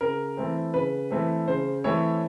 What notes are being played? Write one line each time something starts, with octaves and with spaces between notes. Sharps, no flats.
C#3 A#4
E3 A3 C4
C#3 B4
E3 A3 C4
C#3 C5
E3 A3 C4 C#5